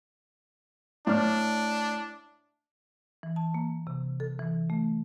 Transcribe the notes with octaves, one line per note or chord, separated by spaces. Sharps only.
A2 D4 D5 F6
E3
A5
A#3
C3
A4
E3
A3